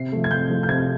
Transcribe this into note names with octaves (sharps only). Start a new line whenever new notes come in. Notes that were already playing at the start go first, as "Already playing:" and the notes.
Already playing: C3 C7
F3 A3
G#6
C3 G6
F3 A3
G6
C3 G#6